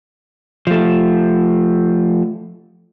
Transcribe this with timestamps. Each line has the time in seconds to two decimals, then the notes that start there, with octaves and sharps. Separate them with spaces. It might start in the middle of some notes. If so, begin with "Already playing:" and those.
0.67 F3 A3